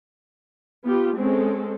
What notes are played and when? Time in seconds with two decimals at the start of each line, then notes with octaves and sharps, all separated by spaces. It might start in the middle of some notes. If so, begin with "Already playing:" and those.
0.85 B3 F4 G4
1.17 G#3 C4 C#4 A4